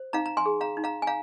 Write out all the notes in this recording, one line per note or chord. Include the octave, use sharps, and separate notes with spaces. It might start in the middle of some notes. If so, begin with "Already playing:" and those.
Already playing: C5
D#4 F5 A#5
A#5
G#5 C6
G#4
F5 A#5
D#4
F5 A#5
G#5
F5 A#5